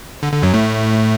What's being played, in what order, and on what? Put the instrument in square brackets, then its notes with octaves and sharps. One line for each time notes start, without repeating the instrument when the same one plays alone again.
[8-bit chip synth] D3
D3
F#2 F#3
A2 A3